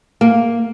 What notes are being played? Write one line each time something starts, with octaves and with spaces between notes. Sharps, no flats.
A#3